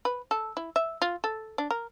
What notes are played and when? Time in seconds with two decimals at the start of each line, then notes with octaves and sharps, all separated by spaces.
0.05 B4
0.31 A4
0.57 E4
0.76 E5
1.02 F4
1.24 A4
1.58 D4
1.71 A#4